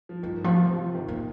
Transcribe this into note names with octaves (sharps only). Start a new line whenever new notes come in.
F3
G2 D#3
F3
C3 F3
D#3
A#2